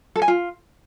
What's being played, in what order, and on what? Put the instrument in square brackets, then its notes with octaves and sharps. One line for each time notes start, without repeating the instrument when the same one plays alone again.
[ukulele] A4
G#5
F4